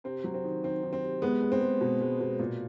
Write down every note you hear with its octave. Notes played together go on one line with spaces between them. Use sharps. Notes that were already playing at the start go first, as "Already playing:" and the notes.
C3 C4
F#3
C4
D#3
D#3 C4
D#3
C4
C3
G#3 B3
G#3
C4
G#3
B2
G#3
B2
A#2